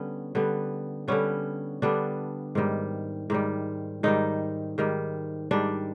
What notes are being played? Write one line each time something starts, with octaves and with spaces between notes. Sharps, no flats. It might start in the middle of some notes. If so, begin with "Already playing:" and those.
Already playing: D3 G3 B3 C#4
D3 G3 B3
D3 G3 B3 C#4
D3 G3 B3 D4
G#2 D#3 G3
G#2 D#3 G3
G#2 D#3 G3 D#4
G#2 D#3 G3
G#2 D#3 G3 D4